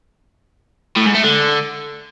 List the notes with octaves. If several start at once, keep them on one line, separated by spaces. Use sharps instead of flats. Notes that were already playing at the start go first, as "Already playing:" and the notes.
A2
G#2
A3
D3